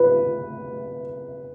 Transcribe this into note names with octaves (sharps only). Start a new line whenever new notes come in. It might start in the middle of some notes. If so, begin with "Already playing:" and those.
Already playing: B4